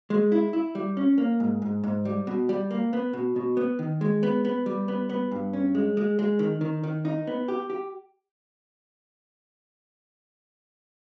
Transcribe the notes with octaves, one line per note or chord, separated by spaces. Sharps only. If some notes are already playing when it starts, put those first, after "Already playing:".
G#3
E4
E4
G3
C#4
A#3
G#2
G#2
G#2
G3
B2
G3
A#3
B3
B2
B2
B3
D#3
G#3
B3
B3
G3
B3
B3
G2
C#4
G#3
G#3
G#3
D#3
D#3
D#3
D#4
B3
G4
G4